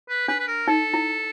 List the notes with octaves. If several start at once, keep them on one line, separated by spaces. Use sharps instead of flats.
B4
D4 B4
B4
A#4
D#4 A4
E4